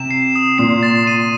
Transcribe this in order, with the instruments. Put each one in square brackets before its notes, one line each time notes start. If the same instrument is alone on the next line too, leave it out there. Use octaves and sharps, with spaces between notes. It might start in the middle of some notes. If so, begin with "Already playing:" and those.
Already playing: [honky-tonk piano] C3 [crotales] E7
[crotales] C7
D#6
[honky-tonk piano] A#2 [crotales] C7
[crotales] A6
D#7